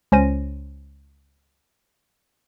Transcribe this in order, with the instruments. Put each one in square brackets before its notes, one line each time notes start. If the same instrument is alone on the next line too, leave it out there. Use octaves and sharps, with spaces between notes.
[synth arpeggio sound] C#2 C#4 C5 A#6 D#7